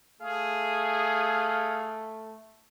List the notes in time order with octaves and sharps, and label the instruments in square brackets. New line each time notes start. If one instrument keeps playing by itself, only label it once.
[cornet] A3 [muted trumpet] G#4 [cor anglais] F5